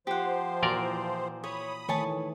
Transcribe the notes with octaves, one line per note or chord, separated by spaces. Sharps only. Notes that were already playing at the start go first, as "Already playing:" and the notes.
F3 G4 C5 F#5
A#2 E3 F#4 A#4 D5
C#5 B5 D#6
D#3 E3 A3 C#5 G#5 A5